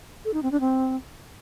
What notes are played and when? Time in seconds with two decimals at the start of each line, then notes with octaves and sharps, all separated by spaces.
0.25 A4
0.34 D#4
0.43 C4
0.52 D4
0.61 C4